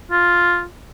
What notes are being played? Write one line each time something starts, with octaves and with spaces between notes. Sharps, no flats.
F4